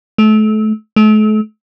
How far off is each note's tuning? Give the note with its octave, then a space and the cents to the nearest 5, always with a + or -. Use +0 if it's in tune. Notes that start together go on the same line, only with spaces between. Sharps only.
A3 -30
A3 -40